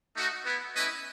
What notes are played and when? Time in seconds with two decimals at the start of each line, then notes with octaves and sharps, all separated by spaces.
0.17 A3 D#4 F#4
0.46 B3 E4
0.75 A3 C#4 E4 B4 D#5